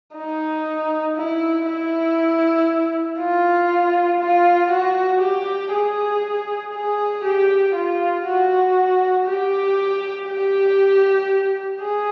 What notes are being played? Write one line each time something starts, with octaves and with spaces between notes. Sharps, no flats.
D#4
E4
E4
F4
F4
F#4
G4
G#4
G#4
G4
F4
F#4
G4
G4
G#4